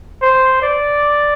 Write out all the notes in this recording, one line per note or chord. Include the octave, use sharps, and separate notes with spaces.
C5
D5